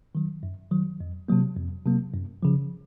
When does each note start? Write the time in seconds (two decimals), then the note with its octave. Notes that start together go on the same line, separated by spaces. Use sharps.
0.15 D#3 F#3
0.43 F#2
0.71 D#3 F#3
1.00 F2
1.28 C3 F#3 A#3
1.57 F2
1.86 C3 F#3 A#3
2.14 F#2
2.43 C#3 F3